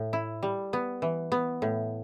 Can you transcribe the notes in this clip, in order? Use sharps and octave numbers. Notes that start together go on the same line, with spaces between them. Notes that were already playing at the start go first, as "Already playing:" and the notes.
Already playing: A2
E4
G3
B3
E3
B3
A2